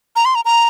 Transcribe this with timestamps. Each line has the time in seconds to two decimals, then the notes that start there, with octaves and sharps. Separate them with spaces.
0.16 A#5
0.25 C6
0.35 A#5
0.45 A#5